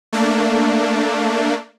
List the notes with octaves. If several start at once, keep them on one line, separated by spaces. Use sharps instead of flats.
A3 A#3 D4